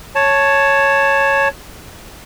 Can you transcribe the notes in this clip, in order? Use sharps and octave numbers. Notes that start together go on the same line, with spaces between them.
C#5 A5